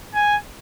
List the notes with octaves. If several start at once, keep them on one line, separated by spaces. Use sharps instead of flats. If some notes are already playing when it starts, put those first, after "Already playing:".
G#5